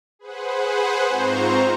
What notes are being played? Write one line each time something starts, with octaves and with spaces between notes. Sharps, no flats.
G#4 B4 C5 F#5
G#2 C4 F4 C5 A#5 C#6